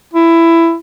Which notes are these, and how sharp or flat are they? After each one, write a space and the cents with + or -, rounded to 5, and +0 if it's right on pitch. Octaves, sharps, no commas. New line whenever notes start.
E4 +15